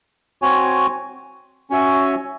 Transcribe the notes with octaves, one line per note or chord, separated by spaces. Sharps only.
C4 F#4 C#5 G#5
C#4 F#4 C#5 E5 G#5